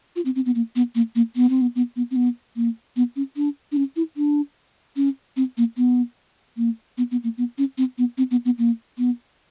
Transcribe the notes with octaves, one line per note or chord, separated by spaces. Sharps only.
F4
C4
C4
B3
A#3
B3
A#3
A#3
B3
C4
B3
B3
B3
C4
B3
A#3
B3
C#4
D4
D4
C#4
E4
D4
C#4
C4
A#3
B3
A#3
B3
B3
A#3
B3
C#4
C4
B3
C4
B3
B3
A#3
B3